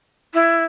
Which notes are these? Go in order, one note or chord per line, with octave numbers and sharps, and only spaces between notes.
E4